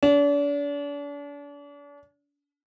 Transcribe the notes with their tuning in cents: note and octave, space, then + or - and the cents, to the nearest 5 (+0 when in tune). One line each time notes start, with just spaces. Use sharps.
D4 -40